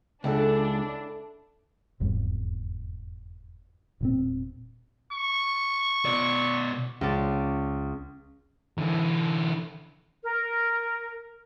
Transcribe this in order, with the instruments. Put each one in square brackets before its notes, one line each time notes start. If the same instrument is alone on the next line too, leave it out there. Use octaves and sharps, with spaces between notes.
[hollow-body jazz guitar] C#2 [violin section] D4 [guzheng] E4 A4 F#5
[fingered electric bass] F1 E2 G#2 G3
E1 A#2 C4
[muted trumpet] C#6
[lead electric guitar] B2 D5
[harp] C#2 D5
[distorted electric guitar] D3 E3
[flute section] A#4